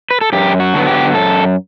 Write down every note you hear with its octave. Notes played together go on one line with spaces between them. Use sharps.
B4
A4
F#2 G4
F#4
D3 F#3 B3
G4
F#2 A4